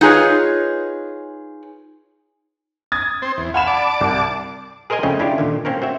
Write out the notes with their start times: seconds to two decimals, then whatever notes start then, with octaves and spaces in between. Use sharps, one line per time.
0.01 D#4 F4 G#4 B4 C#5
2.92 D#6 G#6 A6
3.22 C4 C5
3.37 E2
3.54 F5 F#5 G#5 B5 E7
3.67 D5 A5 D6
4.01 C2
4.90 G#4 A#4 C5 D#5 G#5 A#5
5.03 F2 C#3 A3 C4 C#4 D#5
5.19 C#4 D4 E4 F4 G4
5.38 A#2 D3 D#3
5.65 A#3 C4 C#4 A#4
5.82 C4 F#4 E5